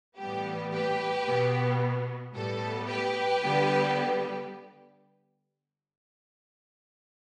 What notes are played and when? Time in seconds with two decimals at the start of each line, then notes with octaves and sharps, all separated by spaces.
0.18 A2 E3 G3 B3 G4
0.72 G4 B4
1.27 B2 B3
2.35 A2 G3 B3 A4
2.89 G4 B4
3.43 D3 G3 B3